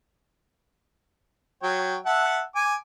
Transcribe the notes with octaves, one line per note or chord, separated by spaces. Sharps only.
F#3 C#5 G5
E5 F#5 A5
G#5 D6